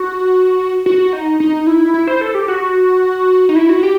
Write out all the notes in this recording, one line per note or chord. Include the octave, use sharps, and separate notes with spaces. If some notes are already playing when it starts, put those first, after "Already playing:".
Already playing: F#4
F#4
D#4
D#4
E4
E4
C5
A4
G4
F#4
D#4
E4
F#4
G4